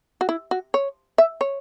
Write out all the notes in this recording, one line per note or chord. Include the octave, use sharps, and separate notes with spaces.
F#4
E4
F#4
C#5
E5
C#5